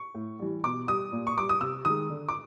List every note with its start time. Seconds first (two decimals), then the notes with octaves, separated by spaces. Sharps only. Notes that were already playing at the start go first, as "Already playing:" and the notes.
Already playing: C#6
0.15 A2
0.39 E3 G3
0.63 B2 D6
0.87 G3 D#6
1.12 A#2
1.27 C#6
1.37 G3 D6
1.49 D#6
1.61 C3 E6
1.85 D#3 G#3 D#6
2.10 D3
2.29 D6